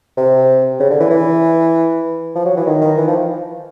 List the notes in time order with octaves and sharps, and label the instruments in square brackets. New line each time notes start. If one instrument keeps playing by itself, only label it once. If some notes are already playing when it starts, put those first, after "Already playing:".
[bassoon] C3
C#3
D3
E3
E3
F3
F#3
E3
D#3
D#3
E3
F3